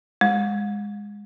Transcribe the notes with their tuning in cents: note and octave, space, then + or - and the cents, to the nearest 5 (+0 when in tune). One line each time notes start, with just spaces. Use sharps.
G#3 -15